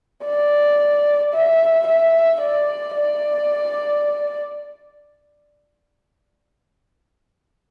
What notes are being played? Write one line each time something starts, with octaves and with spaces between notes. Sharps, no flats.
D5
E5
E5
D5
D5